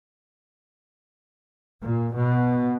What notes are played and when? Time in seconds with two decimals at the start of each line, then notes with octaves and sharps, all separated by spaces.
1.82 A#2
2.14 B2